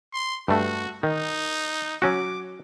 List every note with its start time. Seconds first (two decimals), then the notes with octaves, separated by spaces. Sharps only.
0.13 C6
0.48 G2 A3 F#4
1.03 D#3 D#4
2.02 F#3 C#4 F#4 D6